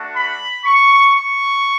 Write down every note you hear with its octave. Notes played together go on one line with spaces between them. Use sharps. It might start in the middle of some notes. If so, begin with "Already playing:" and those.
Already playing: A3 D4 F#4
B5
C#6
C#6